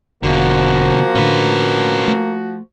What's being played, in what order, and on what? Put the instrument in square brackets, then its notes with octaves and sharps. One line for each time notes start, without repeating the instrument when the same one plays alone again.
[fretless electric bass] E1 [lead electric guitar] B2 D3 [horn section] F3 F#4 [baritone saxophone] A#3
[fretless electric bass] A2 D3 [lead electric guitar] C#4 B4
[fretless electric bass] A3